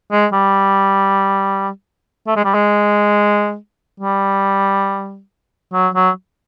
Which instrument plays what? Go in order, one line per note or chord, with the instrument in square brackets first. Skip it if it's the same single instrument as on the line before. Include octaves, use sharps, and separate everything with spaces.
[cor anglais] G#3
G3
A3
G#3
G3
G#3
G3
F#3
F#3